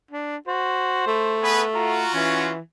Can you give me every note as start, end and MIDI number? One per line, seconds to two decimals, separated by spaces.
0.11 0.37 62
0.48 1.03 66
0.48 1.48 72
1.07 2.03 57
1.42 1.63 59
1.42 1.63 68
1.42 1.63 71
1.75 2.52 65
1.75 2.52 66
1.75 2.14 82
2.14 2.59 52
2.14 2.50 61